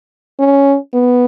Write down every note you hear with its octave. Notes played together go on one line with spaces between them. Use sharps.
C#4
B3